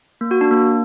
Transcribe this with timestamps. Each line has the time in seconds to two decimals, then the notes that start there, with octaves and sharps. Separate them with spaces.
0.21 A#3
0.31 F#4
0.41 D4
0.51 A#3